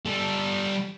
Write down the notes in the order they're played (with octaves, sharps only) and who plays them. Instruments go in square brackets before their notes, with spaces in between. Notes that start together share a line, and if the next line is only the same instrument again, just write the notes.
[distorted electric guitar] G3 A4